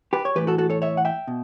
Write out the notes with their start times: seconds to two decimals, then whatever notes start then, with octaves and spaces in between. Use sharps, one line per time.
0.13 G4 B4
0.25 C#5
0.35 A2 E3 G4 B4
0.47 F#4 A4
0.58 F#4 A4
0.70 A4 C#5
0.82 C#5 E5
0.97 F#5
1.05 E5 G5
1.28 B2